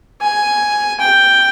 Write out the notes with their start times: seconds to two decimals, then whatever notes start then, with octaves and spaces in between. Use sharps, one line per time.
0.21 G#5
1.00 G5